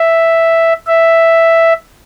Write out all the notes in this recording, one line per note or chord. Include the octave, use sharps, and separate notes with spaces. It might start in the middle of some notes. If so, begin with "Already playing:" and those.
Already playing: E5
E5